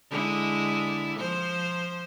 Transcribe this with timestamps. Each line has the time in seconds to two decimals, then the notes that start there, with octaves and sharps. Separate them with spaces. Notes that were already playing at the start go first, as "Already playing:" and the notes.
0.10 D3 G#3 E4
1.19 F3 C5